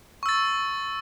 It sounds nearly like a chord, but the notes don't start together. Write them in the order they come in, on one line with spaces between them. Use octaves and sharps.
C#6 E6 A6